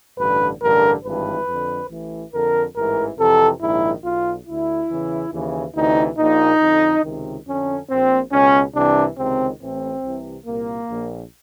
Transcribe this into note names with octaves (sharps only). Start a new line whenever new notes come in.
A1 G2 D3 B4
A1 G2 D3 A#4
G#1 G2 E3 B4
F2 D3
A1 A2 E3
F2 D3 A#4
A1 G#2 E3 A#4
F2 C3 E3 A4
A#1 G#2 D#3 E4
B1 B2 F4
D2 D3 E4
E2 C#3 E3
D#2 C#3 E3
D2 C3 E3 D#4
A#1 A#2 D#4
F2 D3
C#2 C3 D#3
F2 D3 C#4
A#1 A#2 C4
C#2 B2 C#4
C2 C3 E3 D4
C#2 C3 D#3 C4
A1 A2 E3 C4
C2 C3 E3
C2 A#2 A#3
A#1 A#2